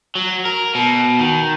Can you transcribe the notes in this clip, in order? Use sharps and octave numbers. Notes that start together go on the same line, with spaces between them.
F#3
A#4
B2
D#3